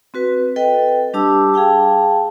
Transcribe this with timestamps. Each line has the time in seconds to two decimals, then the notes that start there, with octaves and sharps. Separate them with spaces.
0.14 C4 F#4 B4
0.56 A4 B4 D#5 G5
1.14 G3 D4 G4 A5 D6 E6
1.54 G#4 F5 G5 A5